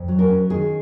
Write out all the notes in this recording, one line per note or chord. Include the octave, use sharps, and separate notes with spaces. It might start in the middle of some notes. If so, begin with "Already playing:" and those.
Already playing: F2
F#3
A#4
C#4
D#3 G#4